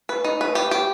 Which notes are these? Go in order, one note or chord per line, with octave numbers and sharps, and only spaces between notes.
B4
D#4
B4
G4
G4